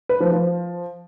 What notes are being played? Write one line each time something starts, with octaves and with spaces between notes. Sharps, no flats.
B4
F3
F3